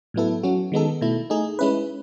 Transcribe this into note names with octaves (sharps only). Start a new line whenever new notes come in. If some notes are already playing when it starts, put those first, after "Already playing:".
A2 F#3 B3 E4 A4
F#3 C#4 F#4
D#3 G#3 B3 D#4 A4
B2 A3 E4
A3 D#4 G#4
G#3 C#4 E4 B4